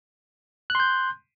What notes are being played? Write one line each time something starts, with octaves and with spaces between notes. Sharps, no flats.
C6 F#6 G6